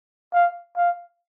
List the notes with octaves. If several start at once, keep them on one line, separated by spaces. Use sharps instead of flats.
F5
F5